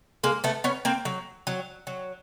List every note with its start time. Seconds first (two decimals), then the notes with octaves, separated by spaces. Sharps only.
0.24 G#3 A#3
0.44 A3 B3
0.64 B3 C#4
0.85 A#3 C4
1.05 F#3
1.47 F#3
1.87 F#3